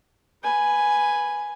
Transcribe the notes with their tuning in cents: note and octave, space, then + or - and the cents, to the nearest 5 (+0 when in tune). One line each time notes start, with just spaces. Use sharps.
B4 +0 G#5 +0